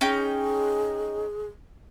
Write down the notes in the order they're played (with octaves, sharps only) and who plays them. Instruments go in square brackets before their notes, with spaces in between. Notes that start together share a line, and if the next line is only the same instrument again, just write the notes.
[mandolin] C#4 D#4 G5 [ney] G#4